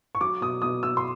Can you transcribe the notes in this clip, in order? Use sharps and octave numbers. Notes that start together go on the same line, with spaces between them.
C#6
F#3 D6
B2 D#6
B2 D#6
B2 E6
C6